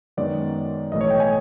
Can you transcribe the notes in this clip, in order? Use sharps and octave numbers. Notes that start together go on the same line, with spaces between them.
F#2 D#3 G#3 B3 D5
B1 A2 E3 A3 D#5
C#5
G5
G#5